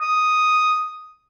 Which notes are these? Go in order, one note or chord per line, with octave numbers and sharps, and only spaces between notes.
D#6